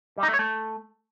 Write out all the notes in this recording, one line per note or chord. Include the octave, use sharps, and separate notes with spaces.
G3
D#4
A3
C#5
A3